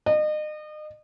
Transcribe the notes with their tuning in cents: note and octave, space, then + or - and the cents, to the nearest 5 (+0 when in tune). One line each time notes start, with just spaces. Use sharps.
D#5 -35